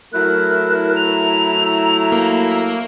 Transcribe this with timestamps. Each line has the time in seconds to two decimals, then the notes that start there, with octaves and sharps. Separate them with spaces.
0.13 F#3 A3 E4 A#4 F#6
0.96 A#5 F7
2.12 A#3